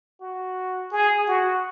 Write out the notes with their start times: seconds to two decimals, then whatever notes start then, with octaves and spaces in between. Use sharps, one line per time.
0.20 F#4
0.91 G#4
1.27 F#4